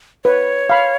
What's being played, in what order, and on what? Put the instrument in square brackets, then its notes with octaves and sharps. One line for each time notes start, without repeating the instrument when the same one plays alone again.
[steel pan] B4 [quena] C#5
[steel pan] F5 B5